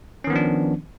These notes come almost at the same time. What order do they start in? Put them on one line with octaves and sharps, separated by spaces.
C#4 D#3 B3 F3 D4